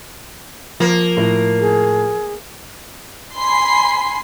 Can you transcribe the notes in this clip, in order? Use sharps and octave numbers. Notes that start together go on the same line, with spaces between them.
F3 A#3
A2
G#4
G#5 B5 C6 C7